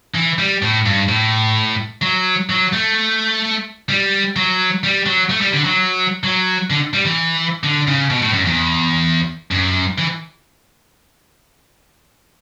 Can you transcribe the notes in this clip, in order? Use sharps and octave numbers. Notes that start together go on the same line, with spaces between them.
E3
G3
A2
G2
A2
F#3
F#3
A3
G3
F#3
G3
F#3
A3
G3
D3
F#3
F#3
D3
G3
E3
D3
C#3
B2
A2
F#2
E2
F#2
E3